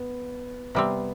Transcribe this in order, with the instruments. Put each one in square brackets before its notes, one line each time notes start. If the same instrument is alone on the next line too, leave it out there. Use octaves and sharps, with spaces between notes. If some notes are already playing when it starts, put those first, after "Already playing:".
Already playing: [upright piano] B3
[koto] C3 G3 C4 [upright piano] B3